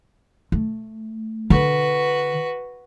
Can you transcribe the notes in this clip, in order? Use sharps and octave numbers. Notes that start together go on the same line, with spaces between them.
A3
D3 F#4 B4